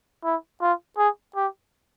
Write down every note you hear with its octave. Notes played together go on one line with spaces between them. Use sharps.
E4
F4
G#4
G4